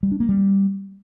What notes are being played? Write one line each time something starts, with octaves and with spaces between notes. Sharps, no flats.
G3
D4
A#3
G3